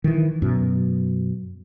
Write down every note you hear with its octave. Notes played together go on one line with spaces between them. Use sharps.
D#3 E3
F#2 B2